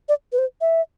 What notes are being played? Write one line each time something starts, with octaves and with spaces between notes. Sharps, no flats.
D5
B4
C5
E5